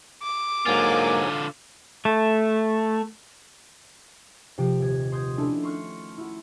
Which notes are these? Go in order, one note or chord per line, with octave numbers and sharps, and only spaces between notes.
D6
G#2 D3 F#3 A#3 F4 G#5
A3
C3 F3 G4
D#1 G#6
C6 D#6 G6 G#6
A3 C#4 D4 E4 A4
C6 C#6 F6 F#6
E4 F#4